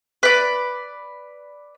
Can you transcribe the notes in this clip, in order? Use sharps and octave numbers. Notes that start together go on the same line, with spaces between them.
B4 D5